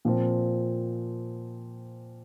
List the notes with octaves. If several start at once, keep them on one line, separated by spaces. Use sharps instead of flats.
A#2 F3 C4